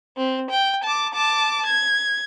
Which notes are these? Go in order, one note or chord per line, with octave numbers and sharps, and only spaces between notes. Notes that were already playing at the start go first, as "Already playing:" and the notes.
C4
G5
A5 D6
A5 D6
G#6